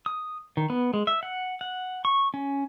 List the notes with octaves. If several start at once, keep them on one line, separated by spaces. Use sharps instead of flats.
D#6
D#3
B3
G#3
E5
F#5
F#5
C#6
C#4